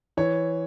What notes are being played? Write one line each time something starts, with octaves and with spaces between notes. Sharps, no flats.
E3 C#5